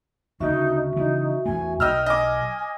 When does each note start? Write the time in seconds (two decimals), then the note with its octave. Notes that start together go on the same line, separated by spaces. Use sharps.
0.40 D2 C#3 D#4 F#4 E5 C#6
0.96 C#3 E3 D#4
1.46 E2 A3 G#5
1.80 B1 D#5 G5 E6 F6
2.06 D#5 G#5 D6